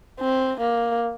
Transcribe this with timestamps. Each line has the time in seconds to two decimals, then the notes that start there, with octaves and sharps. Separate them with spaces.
0.20 C4
0.60 A#3